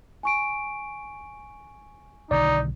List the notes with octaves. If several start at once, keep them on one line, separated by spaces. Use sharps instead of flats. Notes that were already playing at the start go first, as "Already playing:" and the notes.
G#5 C#6 D7
B1 D3 D#3 D#4 D5